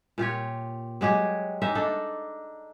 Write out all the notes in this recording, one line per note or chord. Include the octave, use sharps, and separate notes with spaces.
A#2 F4 G4 C#5
F#3 G#3 G4 G#4
G#3 A#3 D#4 E5
D4 D#4 A4